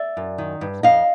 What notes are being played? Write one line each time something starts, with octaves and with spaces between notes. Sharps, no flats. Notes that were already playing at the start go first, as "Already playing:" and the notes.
Already playing: D5 E5
F#2
D#3
G2
F2 D#5 F5